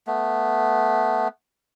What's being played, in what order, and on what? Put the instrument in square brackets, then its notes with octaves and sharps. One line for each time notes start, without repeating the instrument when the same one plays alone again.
[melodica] A3 B3